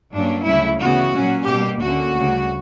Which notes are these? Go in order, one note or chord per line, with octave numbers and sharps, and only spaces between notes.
G2 F#3 A#3 C#4 D4
D2 C#3 F#3 E4
D2 C#3 E3 B3 F#4
A#2 F#3 A#3 C#4
B2 G3 A#3 G4
D2 D3 A#3 C#4 F#4
D2 C#3 G3